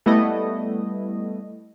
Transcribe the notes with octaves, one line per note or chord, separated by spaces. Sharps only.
G3 A3 B3 E4 D#5